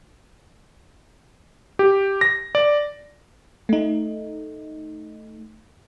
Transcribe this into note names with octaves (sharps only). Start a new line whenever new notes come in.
G4
A#6
D5
A3 D#4